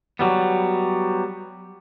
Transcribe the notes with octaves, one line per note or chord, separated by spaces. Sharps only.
F#3 G3 B3